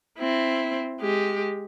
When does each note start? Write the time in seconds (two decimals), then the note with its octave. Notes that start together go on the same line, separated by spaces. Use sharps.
0.18 C4 E4
1.01 G#3 G4